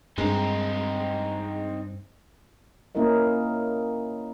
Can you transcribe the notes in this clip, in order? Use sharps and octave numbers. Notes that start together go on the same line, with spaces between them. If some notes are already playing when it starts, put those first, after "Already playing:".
G2 G#3 C4 D#4
A#3 C#4 E4 A#4 D#5